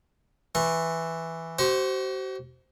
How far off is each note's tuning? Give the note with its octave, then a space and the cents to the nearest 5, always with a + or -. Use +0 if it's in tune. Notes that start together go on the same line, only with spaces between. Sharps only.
E3 +0 C#6 -35
F#4 +45 C5 +0 C#6 +0